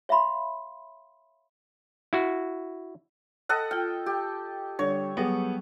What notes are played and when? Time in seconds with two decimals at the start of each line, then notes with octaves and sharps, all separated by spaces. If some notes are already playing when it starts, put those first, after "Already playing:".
0.09 C#5 E5 F5 B5 C6
2.13 E4 F#4
3.49 A4 D#5 F#5
3.71 F4 G5 F6
4.06 G4
4.79 D3 G3 C#5
5.17 F#3 G3 B3 G4 G#4